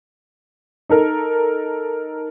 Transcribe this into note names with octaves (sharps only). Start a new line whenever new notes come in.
D#4 A4 A#4